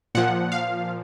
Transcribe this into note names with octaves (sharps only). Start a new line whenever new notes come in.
A#2 F3 F#5
F5